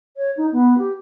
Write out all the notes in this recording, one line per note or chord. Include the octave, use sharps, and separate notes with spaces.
C#5
D#4
B3
G4